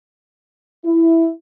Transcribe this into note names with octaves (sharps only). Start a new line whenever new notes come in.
E4